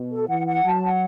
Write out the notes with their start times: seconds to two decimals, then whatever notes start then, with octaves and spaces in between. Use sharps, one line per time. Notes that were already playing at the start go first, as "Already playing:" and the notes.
Already playing: B2
0.11 A4
0.28 E3 F#5
0.47 F#5
0.64 F#3 A5
0.83 F#5